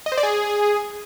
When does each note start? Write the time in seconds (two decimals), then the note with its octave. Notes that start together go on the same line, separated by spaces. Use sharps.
0.06 D#5
0.12 C5
0.18 D5
0.23 G#4